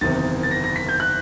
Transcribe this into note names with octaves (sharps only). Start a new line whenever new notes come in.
F#1 E2 C3 D#3 A6
A6
A#6
A#6
B6
G6
F#6